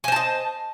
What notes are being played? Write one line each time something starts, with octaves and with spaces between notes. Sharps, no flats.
C5 D#5 G#5 A5